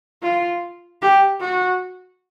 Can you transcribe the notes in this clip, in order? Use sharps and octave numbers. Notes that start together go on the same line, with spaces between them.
F4
G4
F#4